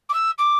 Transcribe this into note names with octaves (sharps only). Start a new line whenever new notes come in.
D6
E6
D6